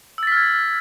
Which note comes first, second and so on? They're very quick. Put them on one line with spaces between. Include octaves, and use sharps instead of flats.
E6 A6 B6 F6 G#6